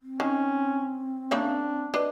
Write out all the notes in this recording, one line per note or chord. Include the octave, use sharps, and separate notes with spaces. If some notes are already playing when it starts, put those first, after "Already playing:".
C4
D#3 C#4
C#3 A#3 D4 E5
D4 B4 D#5